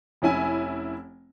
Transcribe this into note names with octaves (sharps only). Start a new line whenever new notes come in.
F1 C#4 E4 G#5